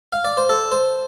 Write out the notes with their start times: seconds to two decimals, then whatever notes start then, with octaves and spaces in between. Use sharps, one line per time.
0.13 F5
0.24 D5
0.37 C5
0.49 A4
0.72 C5